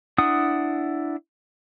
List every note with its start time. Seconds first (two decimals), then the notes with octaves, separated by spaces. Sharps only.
0.18 D4 E4 F#5 D#6